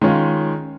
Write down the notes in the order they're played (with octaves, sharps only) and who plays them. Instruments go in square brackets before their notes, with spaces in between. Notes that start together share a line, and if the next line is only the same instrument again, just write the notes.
[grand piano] D#3 G#3 C#4 F4